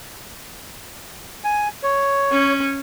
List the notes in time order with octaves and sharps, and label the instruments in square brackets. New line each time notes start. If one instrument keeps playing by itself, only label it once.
[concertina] G#5
C#5
[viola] C#4